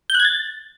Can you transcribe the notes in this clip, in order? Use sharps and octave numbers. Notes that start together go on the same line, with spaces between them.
G6
F#6
G#6
A6